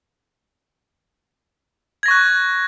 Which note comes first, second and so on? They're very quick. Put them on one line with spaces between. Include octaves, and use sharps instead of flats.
G#6 A#6 C#6 F#6